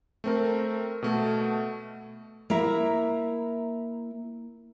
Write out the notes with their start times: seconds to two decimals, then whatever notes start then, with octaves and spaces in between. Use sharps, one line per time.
0.24 A3 C4 A#4
1.02 B2 A3
2.50 A#3 E4 E5 A#5